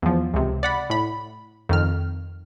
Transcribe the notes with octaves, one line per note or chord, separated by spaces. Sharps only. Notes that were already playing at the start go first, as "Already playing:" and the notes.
E2 F3
C#2 C3
D5 F#5 B5
A2 B5
F2 D#3 F6